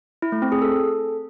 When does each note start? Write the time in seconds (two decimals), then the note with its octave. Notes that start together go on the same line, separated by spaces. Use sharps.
0.22 E4
0.32 A3
0.42 C4
0.52 G#4
0.62 A4